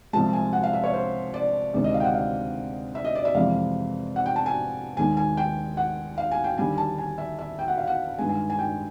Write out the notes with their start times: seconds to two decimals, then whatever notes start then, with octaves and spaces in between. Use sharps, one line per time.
0.13 C2 C3 F3 G#3 A5
0.33 G#5
0.53 F#5
0.63 F5
0.73 E5
0.84 C#5
0.93 C5
1.34 D5
1.74 D2 C3 D#3 G#3 D5
1.84 D#5
1.94 F5
2.00 G5
2.04 F#5
2.14 F5
2.95 E5
3.05 D#5
3.15 D5
3.25 E5
3.35 F2 C3 E3 G#3 F5
4.16 F#5
4.26 G5
4.36 A5
4.46 G#5
4.97 D#2 D#3 G#3 G#5
5.17 G#5
5.37 G5
5.77 F#5
6.18 F5
6.31 G#5
6.44 G5
6.58 D#2 D3 G3 G#5
6.78 A5
6.98 G#5
7.18 E5
7.39 E5
7.59 G5
7.68 F#5
7.78 F5
7.87 F#5
8.18 G2 D#3 G#3 G#5
8.29 G#5
8.50 G#5
8.59 G5